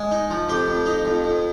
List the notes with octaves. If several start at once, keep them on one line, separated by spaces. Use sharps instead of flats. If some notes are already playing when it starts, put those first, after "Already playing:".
Already playing: G#3
D#4
F3
F2 G4
F2
D#4
F2
F2